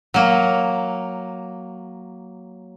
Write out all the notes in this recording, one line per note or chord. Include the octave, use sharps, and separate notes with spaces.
F#3 A#3